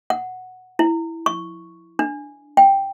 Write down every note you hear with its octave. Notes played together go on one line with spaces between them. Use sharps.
F#5
E4
C#6
D4
G5